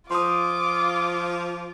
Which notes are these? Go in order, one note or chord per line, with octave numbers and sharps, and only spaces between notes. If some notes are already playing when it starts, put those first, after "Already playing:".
F3 F4 C6 D6 D#6